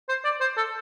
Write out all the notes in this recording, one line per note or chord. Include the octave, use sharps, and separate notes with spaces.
C5
D5
C5
A4